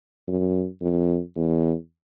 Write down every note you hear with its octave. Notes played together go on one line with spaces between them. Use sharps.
F#2
F2
E2